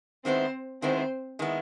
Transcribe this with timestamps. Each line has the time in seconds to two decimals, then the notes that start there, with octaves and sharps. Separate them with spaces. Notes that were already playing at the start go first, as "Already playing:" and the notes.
0.24 D#3 G#3 B3 C4 E4 C5
0.81 D#3 G#3 B3 C4 E4 C5
1.39 D#3 G#3 B3 E4